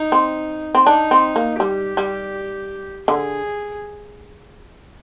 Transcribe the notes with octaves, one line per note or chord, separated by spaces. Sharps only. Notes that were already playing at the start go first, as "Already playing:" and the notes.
Already playing: D#4
C4
C4
D4 D#4
C4
A#3
G3 G4
G3
D3 G#4